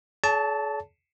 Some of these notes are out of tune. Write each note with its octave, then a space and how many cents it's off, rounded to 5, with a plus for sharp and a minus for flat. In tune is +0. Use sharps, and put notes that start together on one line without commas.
G#4 +45 C#5 +45 A5 +0